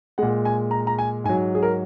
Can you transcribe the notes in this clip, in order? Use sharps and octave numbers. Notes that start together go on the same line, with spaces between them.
A#2 G#3 F#5
G#5
A#5
A#5
G#5
G#2 F#3 G#5
G#4
A#4